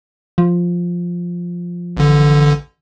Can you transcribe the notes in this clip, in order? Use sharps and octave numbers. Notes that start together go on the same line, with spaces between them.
F3
A1 D3